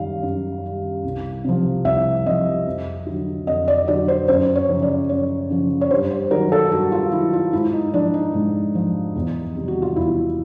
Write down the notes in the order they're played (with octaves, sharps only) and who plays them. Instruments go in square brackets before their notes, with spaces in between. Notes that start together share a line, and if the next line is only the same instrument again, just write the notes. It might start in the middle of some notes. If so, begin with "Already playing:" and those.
Already playing: [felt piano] F#2 D#3 G3 F5
F#2
D#3 G3
C2
C3 F3
C2 E5
C3 F3 D#5
F2
D3 F#3
F2 D#5
D5
D3 F#3 D5
C5
F#2 C5
C#5
C#3 F3
D5
F#2 C#5
C#3 F3
C#5
G2 C5
C5
D#3 F#3 A#4
A4
G2 F#4
F4
D#3 F#3 E4
F4
G#2 E4
D#4
F3 D4
D#4
G#2
F3
E2
C3 D#3 G3
F#4
F4
E2 E4